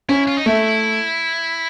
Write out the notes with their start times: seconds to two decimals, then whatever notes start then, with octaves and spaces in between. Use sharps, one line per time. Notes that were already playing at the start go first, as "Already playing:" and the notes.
0.09 C#4 E4
0.28 F4
0.38 D#4
0.46 A3 E4